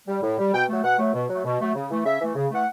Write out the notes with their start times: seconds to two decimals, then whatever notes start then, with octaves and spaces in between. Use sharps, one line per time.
0.08 G3
0.23 A2
0.39 G3
0.54 B2 G5
0.69 F#3 A3
0.84 B2 F#5
0.99 F#3 A3
1.14 B2
1.29 F#3 A3
1.45 B2
1.60 F#3 A3
1.75 C#3
1.91 E3 A3
2.05 C#3 E5
2.21 E3 A3
2.36 C#3
2.51 E3 A3 F#5